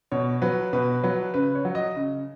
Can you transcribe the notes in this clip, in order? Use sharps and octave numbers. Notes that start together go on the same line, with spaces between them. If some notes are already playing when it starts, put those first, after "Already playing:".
B2 C#5
F#3 B4
B2 B4
F#3 B4
C#3 B4
C#5
F#3
D#5
C#3